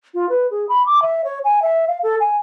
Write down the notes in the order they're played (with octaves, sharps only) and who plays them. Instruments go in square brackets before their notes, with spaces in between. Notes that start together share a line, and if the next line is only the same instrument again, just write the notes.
[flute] F4
B4
G#4
B5
D6
E5
C#5
G#5
E5
F5
A4
G#5